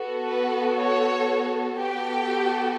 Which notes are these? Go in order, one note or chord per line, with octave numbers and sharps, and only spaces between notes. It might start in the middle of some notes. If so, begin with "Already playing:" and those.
Already playing: B3 F#4 A4
B4
C#5
B3 F#4 G4 A4 G5